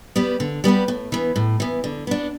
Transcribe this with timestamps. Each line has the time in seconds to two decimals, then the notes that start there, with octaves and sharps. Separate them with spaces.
0.16 G3 B3 G4 B4
0.40 D3
0.64 G3 B3 G4 B4
0.88 A2
1.12 E3 B3
1.36 A2
1.60 E3 B3
1.84 D3
2.07 B3 D4